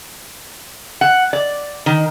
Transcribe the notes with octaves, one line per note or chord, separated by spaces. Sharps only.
F#5
D5
D#3